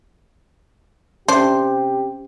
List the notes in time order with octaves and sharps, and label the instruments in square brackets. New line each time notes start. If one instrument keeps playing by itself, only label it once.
[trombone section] C3 G4 [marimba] C#4 E5 [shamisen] D4 [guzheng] C5